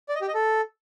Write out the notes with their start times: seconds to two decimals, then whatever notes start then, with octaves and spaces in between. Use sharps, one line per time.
0.09 D5
0.15 D#5
0.22 G4
0.28 D#5
0.34 A4